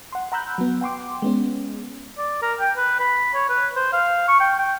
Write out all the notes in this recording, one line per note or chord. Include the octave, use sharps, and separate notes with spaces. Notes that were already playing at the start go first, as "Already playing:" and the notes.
F#5 C6
F#5 A#5 B5 E6 F#6 G6
F#3 B3
F#5 G5 C6 D6
G#3 B3 C#4
D5
A#4
G5
B4
B5
C#5
B4
C5
F5
C#6
G5
G5